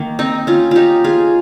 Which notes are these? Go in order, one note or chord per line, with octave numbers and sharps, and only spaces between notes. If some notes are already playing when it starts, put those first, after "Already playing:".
Already playing: D#3 A#3
C4 D#4
C#4 F4
D#4 F4 G4
F4 G#4